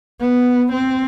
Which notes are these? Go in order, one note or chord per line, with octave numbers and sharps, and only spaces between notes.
B3
C4